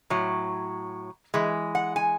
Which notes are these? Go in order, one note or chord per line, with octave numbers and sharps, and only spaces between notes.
A2 F#3
E3 G#3
F#5
G#5